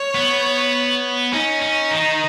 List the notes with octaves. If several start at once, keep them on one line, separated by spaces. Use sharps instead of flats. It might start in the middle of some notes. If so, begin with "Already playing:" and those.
Already playing: C#5
B3
C#4 D#4
C#4
D#3